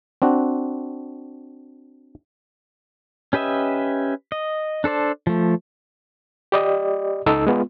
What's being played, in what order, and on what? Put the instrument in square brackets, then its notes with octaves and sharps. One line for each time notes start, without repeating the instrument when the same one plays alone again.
[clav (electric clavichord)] C4 D4 F#4
[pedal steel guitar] C#4 G4 B4 D#5 E5
D#5
D4 A4 C5 D5
F3 A3
[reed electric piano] G4 D5 D#5
C#2 D#4 A4 E6
G#3 B3 F4